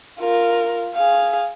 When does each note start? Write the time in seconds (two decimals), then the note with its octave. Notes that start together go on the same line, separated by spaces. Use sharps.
0.20 F4 A#4
0.95 G#4 F5